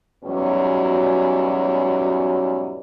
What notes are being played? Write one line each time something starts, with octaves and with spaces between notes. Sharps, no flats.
E2 G#2 B2 F#3 G3 C#4